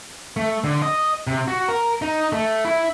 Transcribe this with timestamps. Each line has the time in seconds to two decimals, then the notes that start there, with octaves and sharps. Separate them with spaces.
0.37 A3
0.64 D3
0.82 D#5
1.27 C3
1.48 F#4
1.68 A#4
2.02 D#4
2.32 A3
2.65 E4